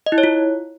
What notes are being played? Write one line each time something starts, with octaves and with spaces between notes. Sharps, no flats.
D#5
E4
C#5
F4